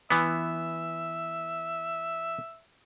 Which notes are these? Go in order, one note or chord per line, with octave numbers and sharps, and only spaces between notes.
E3 B3 E5